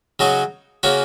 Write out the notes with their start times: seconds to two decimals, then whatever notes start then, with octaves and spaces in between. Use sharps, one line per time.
0.19 C#3 F#3 D#4 F#4
0.83 C#3 A#3 C#4 F#4